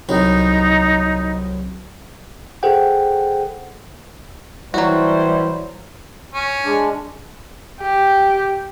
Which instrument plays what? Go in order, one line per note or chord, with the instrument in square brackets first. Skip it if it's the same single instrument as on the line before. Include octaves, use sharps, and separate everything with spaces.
[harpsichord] C2 F#3 [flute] D#4
[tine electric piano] G#4 A4 C5 F#5 G5
[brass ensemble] E3 E4 C5 [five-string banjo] F#3 F#4 [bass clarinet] G3
[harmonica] C#4
[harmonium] G#3 D4
[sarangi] G4